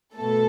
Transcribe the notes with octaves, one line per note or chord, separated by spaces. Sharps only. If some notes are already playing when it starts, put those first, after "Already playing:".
B2 A3 A4